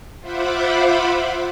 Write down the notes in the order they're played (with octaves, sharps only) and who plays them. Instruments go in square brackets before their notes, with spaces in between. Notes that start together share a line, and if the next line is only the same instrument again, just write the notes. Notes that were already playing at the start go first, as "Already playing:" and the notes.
[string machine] F4 C5 E5 F#5 B5 D6